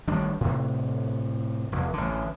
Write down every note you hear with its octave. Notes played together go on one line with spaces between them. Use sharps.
A1 D#3 G3 D4
A2 C3
F1 E2
A1 D3